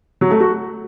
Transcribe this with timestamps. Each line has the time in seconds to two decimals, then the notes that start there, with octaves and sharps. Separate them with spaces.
0.21 F#3
0.31 A3
0.40 F#4